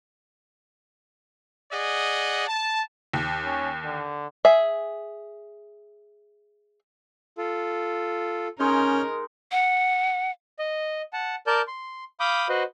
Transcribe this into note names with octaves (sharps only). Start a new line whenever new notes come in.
G#4 D5 D#5 F#5
A5
D#2
C#4
D3
G#4 E5
F4 A4
G#3 C#4 D#4 A#4 C#5 F6 G6
F#5
D#5
F#5 A5
A#4 D5 A5 G6
C6
F5 B5 D6 D#6 G6
F#4 B4 C5 D#5